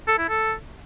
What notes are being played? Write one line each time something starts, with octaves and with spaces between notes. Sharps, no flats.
A4
E4
A4